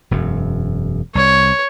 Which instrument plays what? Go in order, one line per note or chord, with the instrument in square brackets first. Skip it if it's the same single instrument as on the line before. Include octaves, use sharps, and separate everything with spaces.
[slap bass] E1 F#2
[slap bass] C2 [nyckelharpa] C#5